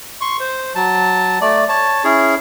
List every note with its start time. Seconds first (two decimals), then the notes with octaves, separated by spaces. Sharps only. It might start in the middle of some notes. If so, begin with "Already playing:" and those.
0.21 C6 C#6
0.40 C5
0.75 F#3 A5
1.41 A3 D5
1.69 C#5 A5
2.04 C#4 E4 G#4 C#5